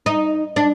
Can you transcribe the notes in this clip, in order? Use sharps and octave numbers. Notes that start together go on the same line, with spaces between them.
D#4
D4